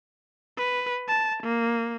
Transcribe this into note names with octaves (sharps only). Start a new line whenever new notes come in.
B4
A5
A#3